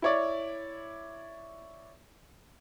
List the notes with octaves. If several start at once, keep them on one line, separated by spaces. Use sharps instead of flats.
E4 C#5 D5